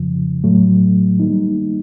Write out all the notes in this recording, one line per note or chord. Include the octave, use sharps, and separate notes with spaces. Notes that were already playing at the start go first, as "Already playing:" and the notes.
Already playing: F2 C#3 F3
A2 F#3 A3
D#3 G3 A#3 D#4